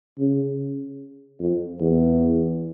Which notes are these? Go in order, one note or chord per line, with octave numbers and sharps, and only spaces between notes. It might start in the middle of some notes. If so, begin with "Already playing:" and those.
C#3
F2
E2